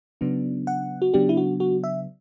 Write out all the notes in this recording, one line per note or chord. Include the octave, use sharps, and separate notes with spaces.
C#3 F#3 B3 D4
F#5
F#4
C#3 F#3 B3 D4 G4
E4
F#4
F#4
E5